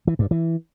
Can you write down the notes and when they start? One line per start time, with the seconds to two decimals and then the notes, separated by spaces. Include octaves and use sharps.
0.07 E3
0.19 G2
0.31 E3